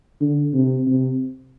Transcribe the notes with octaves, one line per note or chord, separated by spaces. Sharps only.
D3
C3
C3